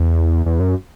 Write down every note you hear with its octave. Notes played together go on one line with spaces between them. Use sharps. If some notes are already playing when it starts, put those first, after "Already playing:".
Already playing: E2
E2
F#2